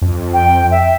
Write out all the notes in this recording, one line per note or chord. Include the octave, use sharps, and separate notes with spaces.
F2
G5
E5